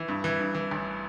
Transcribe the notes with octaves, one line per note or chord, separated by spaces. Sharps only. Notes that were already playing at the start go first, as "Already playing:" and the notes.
Already playing: E3
G2
E3
G2
E3
A1